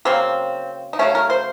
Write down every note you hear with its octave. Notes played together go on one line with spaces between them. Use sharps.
C#3 F#3 A#3 C4
D#4
C#3 F#3 A3 C#4
A#4
C5